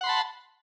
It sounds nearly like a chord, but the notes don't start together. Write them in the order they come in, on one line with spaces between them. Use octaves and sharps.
F#5 C6 B5 A5